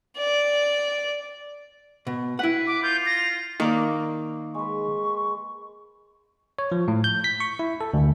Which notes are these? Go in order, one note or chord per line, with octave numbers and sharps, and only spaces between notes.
D5
B2
E4 B4 F#5
D6
F4 G6
A#6
D#3 A#3 A#4 D5
G#3 B4 C#6
C#5
F3
A2
G6
B6
C#6
E4
A4
D2